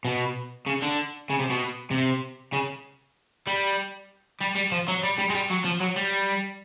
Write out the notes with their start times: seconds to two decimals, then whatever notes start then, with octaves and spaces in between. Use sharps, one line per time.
0.05 B2
0.66 C#3
0.82 D3
1.30 C#3
1.39 C3
1.50 B2
1.91 C3
2.53 C#3
3.47 G3
4.41 G3
4.56 G3
4.72 F3
4.88 F#3
5.03 G3
5.18 G3
5.30 G#3
5.35 G3
5.50 F#3
5.65 F3
5.81 F#3
5.97 G3